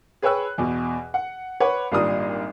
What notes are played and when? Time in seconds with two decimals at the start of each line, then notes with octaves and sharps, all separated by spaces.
0.22 G#4 B4 C#5 G5 E6 F#6
0.58 E2 B2
1.14 F#5
1.60 B4 C#5 F#5 D6
1.92 G#1 A#2 G3 D4 A#4 D#6